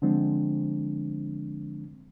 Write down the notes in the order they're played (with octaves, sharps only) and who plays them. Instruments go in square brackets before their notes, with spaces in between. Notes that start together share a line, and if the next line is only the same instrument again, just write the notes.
[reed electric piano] D3 F3 G#3 C4 D4